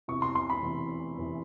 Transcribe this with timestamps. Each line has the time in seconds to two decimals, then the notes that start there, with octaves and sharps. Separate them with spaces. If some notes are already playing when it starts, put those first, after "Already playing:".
0.08 E2 C3 E3 C#6
0.22 C6
0.35 C6
0.50 B5
0.63 E2 C3 E3
1.18 E2 C3 E3